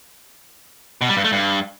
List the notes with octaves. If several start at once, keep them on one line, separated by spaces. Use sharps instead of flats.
B2
G3
G2
A3
G2